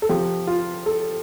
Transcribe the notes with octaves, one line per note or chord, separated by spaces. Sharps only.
A4
C3 F3 G4
F4
A4